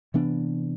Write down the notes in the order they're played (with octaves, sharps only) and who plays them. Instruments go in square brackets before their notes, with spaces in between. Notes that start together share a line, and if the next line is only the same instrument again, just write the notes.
[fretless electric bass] C3 E3 B3 D4